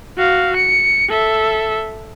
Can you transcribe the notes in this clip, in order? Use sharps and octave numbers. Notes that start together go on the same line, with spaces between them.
F#4 F5
C#7
A4 E5